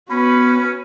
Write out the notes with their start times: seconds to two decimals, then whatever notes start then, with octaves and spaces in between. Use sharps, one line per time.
0.10 B3 C#4 F#4 B4 B5